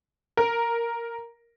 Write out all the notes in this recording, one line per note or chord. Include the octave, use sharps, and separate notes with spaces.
A#4